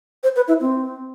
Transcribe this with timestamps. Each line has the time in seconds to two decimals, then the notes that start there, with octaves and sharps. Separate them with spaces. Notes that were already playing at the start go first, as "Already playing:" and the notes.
0.23 C5
0.36 B4
0.48 E4
0.61 C4